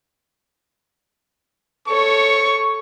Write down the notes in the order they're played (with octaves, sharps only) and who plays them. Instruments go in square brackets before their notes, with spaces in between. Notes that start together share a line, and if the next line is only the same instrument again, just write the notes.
[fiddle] A4 C#5 [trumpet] C#6